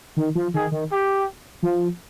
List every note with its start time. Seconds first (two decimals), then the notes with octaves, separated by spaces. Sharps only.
0.17 D#3
0.35 F3
0.53 D#3 G#4
0.71 D#3
0.90 G4
1.63 F3